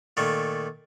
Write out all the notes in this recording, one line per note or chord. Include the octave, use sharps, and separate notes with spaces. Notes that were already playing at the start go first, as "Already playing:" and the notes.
A#2 D#3 A3